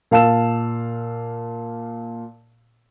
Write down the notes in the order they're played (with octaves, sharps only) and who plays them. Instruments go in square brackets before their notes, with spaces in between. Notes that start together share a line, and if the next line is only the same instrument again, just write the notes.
[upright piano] A#2 F5 A5 E6 E7